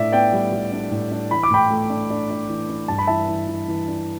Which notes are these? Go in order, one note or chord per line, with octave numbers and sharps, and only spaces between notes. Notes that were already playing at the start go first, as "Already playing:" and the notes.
Already playing: A2 D4 D5 E5
B3 D5 G5
G3
G3
D4
A2
D4
E3 B5
D6
A2 G5 B5
A3
D4
D4
D4
E3
D4
G2 A5
B5
E3 E5 A5
E3
E3
E3
D4